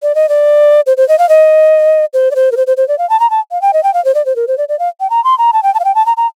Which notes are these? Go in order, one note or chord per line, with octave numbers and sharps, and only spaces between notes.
D5
D#5
D5
C5
C5
D#5
F5
D#5
C5
D5
C5
A#4
C5
C5
C5
D5
F5
A5
A#5
A5
F5
G5
D#5
G5
F5
C5
D5
C5
A#4
C5
D5
D5
F5
G5
A#5
C6
A#5
A5
G5
A5
F5
G5
A5
A#5
A#5